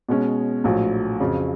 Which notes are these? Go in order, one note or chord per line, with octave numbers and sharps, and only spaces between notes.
B2 G#3 C#4
A#1 A2 F#3
F2 C#3 F#3